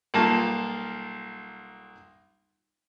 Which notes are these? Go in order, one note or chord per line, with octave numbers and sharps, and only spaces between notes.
B1 G3 A#3 F4 A5